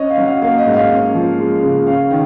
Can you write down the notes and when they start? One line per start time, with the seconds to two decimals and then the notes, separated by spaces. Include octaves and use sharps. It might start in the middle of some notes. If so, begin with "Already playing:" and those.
Already playing: C#4 D#5
0.10 F5
0.18 F#3
0.26 F5
0.42 A#3 F5
0.58 D#5
0.66 G#2
0.74 F5
0.90 C#4
1.14 F3
1.39 G#3
1.62 C#3
1.87 C#4 F5
2.11 D#3